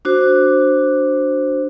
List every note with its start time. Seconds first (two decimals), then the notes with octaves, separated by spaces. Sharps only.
0.05 D4 F#4 C5